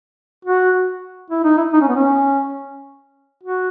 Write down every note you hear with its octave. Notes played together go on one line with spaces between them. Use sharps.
F#4
E4
D#4
E4
D#4
C#4
B3
C#4
F#4